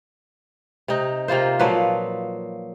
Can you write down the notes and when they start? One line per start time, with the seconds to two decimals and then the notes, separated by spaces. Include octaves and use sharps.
0.88 C3 D#4
1.28 C3 A#3 F4 C5
1.59 A#2 F3 F#3 B4